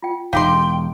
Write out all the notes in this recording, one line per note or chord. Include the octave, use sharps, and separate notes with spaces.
F4 G5
E1 D#4 G4 G#4 F5 G5 C6